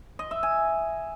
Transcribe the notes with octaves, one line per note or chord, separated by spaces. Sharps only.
D#5
E5
G#5